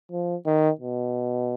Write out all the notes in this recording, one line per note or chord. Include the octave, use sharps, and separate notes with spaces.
F3
D#3
B2